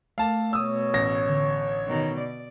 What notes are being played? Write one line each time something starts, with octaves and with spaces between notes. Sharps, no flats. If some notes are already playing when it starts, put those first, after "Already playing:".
A3 A#4 F5 A5 D6
B2 C#5 D#6 E6
A1 A#6
D3
B2 D#3
D5